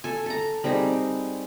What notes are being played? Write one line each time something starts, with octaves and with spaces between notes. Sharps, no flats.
A4 G#5
A4 A#5
G3 C4 D#4 G#4